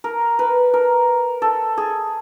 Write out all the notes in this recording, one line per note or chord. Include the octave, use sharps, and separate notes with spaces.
A#4
B4
A#4
A4
G#4